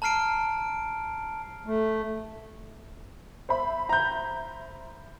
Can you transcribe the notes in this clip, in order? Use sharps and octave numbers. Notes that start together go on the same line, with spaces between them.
A5 A#5 F6 C7 D7
A3
C5 E5 B5
A#5 G6